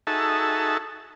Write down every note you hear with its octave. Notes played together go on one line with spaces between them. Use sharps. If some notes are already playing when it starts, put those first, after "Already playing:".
D#4 F#4 G#4 A4 E5 A5